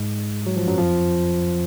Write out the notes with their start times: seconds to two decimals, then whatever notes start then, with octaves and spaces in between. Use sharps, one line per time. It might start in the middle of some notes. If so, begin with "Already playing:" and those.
Already playing: G#2 G#3
0.46 F#3
0.57 F3
0.67 F#2 F#3
0.78 F2 F3